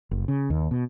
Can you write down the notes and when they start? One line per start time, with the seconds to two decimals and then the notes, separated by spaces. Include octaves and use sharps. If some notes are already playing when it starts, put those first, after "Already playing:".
0.11 F#1
0.28 C#3
0.50 D#2
0.71 B2